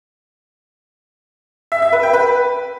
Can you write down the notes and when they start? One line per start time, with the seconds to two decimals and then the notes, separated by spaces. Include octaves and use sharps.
1.72 E5
1.82 E5
1.93 B4
2.03 G5
2.13 B4